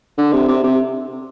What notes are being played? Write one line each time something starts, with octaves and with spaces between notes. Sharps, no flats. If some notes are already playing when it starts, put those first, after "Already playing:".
D3
C3
C3
C3